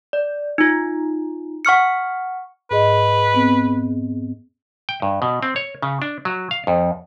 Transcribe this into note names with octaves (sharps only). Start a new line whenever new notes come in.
D5
D#4 F4
F#5 C#6 F6 C#7
G#2 G#4 B4 D#5
B3 C4
G5
G2
B2
C4
C#5
C#3
D4
F#3
F5
F2